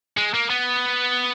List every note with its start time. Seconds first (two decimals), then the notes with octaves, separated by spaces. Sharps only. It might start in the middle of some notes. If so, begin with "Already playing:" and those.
0.17 G#3
0.34 A#3
0.50 B3